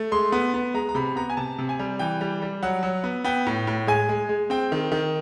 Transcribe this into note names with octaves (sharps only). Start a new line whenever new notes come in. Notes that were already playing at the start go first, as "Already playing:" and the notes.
Already playing: A3
G#3 C6
B3
B3
G#3 A#5
A#5
C3 B5
B3 A#5
G#5
C3 A5
C3
G#5
G3
E3 G5
G3
G3
F#3 F#5
F#3
B3
B3 G5
A2
A2
G#3 G#5
G#3
G#3
C4 G5
D#3
D#3